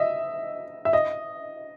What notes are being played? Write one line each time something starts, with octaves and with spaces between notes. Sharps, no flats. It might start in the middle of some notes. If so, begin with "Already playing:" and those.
Already playing: D#5 E5
E5
D#5